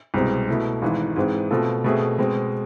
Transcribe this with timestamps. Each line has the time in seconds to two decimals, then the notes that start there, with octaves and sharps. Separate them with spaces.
0.14 C2 B2 G#3 C4
0.48 B2 A3 E4
0.82 G#1 G#2 E3
1.16 G#2 E3 G#3 C4
1.51 B2 A3 C4 F4 A4
1.84 B2 A3 C4 G#4
2.18 B2 G#3 C4